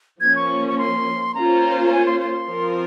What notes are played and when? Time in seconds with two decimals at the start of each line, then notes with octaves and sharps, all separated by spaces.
0.21 F3 A#3 C#4 G#6
0.36 C#6
0.68 C#6
0.78 C6
1.35 A#3 C#4 F4 C5 A#5
1.86 A#5
1.92 G#5
2.06 C6
2.20 C6
2.48 F3 C4 F4 A#4